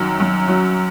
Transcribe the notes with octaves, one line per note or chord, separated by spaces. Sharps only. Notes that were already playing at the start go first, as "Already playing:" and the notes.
Already playing: F#2 D#3 F#3
F#2
F#3